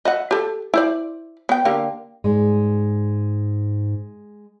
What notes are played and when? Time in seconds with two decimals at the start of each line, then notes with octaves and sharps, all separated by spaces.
0.05 D#5 E5 F#5
0.31 G4 A4
0.74 E4 C5 D5
1.49 B3 G5
1.65 D3 A#3 G4
2.24 G#2 G#3 D5